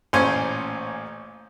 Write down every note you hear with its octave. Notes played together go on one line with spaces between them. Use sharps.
A1 A#2 C#4 C5